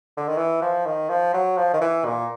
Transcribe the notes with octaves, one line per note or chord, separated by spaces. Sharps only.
D3
D#3
E3
F3
D#3
F3
F#3
F3
D#3
E3
A#2